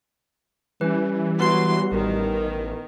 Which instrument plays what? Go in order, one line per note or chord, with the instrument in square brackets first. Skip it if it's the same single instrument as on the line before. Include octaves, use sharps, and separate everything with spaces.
[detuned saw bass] E3 [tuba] G3 [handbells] C#4 B4
[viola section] F#3 C6 [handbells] B3 B4 C7
[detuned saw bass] A1 [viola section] D#3